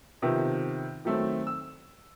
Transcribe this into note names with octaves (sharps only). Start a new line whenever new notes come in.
C3 D#3 F3 B3
D#3 F#3 A3 C4
E6